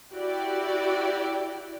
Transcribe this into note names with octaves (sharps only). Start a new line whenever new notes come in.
E4 F#4 G4 D5